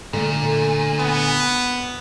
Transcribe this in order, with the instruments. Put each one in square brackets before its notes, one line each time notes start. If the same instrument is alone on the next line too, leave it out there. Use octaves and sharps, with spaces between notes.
[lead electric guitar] A#2 [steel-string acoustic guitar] D3 A3
[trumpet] B3